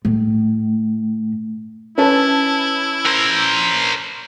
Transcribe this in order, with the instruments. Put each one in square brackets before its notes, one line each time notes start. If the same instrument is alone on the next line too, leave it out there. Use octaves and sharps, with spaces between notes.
[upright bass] A2
[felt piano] C#4 B4 A5 [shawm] E4
[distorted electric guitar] A#4 C5